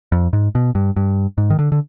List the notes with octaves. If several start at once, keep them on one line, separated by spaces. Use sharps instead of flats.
F2
G#2
B2
G2
G2
G#2
D#3
D3
D3